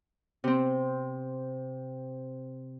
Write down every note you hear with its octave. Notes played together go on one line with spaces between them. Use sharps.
C3 C4